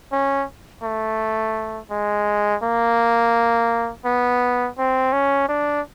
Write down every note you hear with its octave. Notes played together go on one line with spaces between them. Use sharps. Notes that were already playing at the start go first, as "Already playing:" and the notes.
C#4
A3
G#3
A#3
B3
C4
C#4
D4